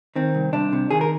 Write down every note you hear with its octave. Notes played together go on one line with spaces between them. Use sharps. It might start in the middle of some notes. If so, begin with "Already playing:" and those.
D#3 C4
C2
C2 D4
C3
D#3 G#4
A#4